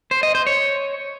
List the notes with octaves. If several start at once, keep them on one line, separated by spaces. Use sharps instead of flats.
C5
D#5
C5
C#5